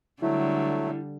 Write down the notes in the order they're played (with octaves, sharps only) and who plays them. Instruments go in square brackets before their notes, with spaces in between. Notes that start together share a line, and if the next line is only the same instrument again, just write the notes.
[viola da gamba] D3 G3 [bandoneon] F#3 A3 [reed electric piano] E4